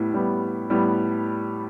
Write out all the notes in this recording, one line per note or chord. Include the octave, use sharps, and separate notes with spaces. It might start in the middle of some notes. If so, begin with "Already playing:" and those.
Already playing: A2 G3 B3
A2 G3 B3
A2 G3 B3